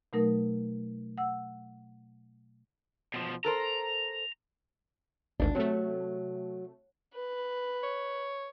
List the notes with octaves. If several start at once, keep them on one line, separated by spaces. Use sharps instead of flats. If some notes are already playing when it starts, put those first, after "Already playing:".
B2 F#3 A3 D#4 A#4
F#5 E6
B2 F3
A4 A#4 C5 A#5
G#1 D2 D4
C3 F#3 A3
B4
C#5